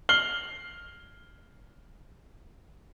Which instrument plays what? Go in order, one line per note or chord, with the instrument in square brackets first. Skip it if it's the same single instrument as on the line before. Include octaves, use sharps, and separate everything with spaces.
[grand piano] F6 C7 F#7 G7